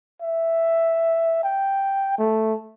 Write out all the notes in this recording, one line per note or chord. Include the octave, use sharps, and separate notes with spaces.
E5
G5
A3